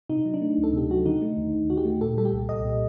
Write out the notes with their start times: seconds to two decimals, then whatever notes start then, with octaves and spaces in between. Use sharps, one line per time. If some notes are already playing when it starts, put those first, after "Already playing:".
0.09 C3 D#4
0.25 F#3
0.34 D4
0.41 A3
0.58 D2
0.63 A4
0.73 C3 G4
0.90 F#3 F#4
1.05 D3 D#4
1.22 A3
1.37 D#2
1.53 D#2
1.70 D3 F#4
1.77 G4
1.85 A3
2.01 A#2 A4
2.17 G3 A4
2.25 G4
2.33 C2
2.49 C2 D#5
2.65 A#2